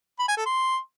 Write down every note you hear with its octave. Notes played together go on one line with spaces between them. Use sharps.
B5
G#5
A4
C6